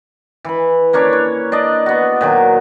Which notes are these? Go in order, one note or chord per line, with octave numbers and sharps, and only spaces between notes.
E3 B5
A#3 C#4 D4 C#5
C#5
D4 D5 D#5
B3 F#4
A#2 D#3 F#3